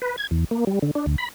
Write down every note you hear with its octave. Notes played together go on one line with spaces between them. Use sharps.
B4
G#6
E2
A#3
G3
D3
D4
D2
B5